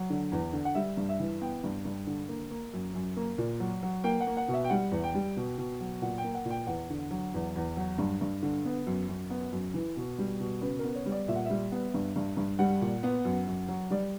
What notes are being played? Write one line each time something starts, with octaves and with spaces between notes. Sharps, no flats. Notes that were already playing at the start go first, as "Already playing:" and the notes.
Already playing: F#3
D3
E2
D3
F#5
G3 E5
G2
E5
E3
B3 G5
G2
G2
D3
A#3
A#3
F#2
F#2
A#3
A#2
F#3
F#3
A#3 G5
F#5
A#3
F#5
B2
E5
G5
G3 F#5
E2
G5
G3
B2
B2
F#3
A#2 F#5
G5
A#3
F#5
A#2
G5
E2 F#5
D3
F#3
E2
E2
F#3
G2
G2
D3
B3
F#2
F#2
B3
F#2
E3
B2
G3
B2
C#3 B4
A#4
B3
C#5
G3
D5
A#2 E5
F#5
G3 E5
B3
G2
G2
G2
G3 F#5
A#2
B3
F#2
F#2
F#3
G3 D5